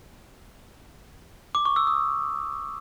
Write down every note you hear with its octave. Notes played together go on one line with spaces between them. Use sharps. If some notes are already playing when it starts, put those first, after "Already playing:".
D6
C#6
E6
D#6